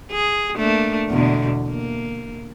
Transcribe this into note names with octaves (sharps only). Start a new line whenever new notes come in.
G#4
A3 A#3 D4
E2 B2 D3
A#3